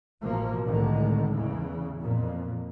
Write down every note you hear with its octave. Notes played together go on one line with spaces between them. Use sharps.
A1 B2 F3 A#3
C2 A2 D3 D#3 G#3
E2 C#3 E3
F2 A#2